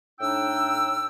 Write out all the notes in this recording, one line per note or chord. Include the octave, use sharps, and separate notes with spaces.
A2 D4 D#4 G5 E6